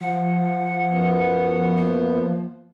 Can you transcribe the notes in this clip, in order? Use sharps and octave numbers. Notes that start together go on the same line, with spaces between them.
F3 F#5
F#2 B3
A#3